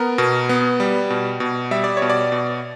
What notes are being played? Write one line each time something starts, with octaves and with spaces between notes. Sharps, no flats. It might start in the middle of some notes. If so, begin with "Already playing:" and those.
Already playing: B3 A#4
B2
B3
G3
B2
B2
G3 E5
D5
C#5
B2
D5
B2